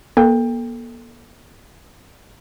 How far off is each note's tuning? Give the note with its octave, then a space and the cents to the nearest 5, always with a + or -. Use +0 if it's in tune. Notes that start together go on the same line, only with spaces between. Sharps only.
A#3 +40 A4 +0 G5 +25